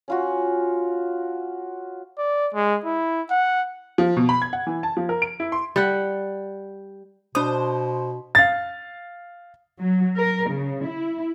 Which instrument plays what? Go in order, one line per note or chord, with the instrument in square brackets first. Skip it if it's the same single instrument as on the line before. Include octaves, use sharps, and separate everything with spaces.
[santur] C#4 F4 F#4
[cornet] D5
G#3
E4
F#5
[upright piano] F3
B2
B5
G#6
F#5
E3
A5
F3
A#4
D7
E4
C6
[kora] G3 F#5
[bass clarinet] B2 [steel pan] D4 D#6 [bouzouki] C5
[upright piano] F5 A6
[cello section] F#3
A#4
C#3
E4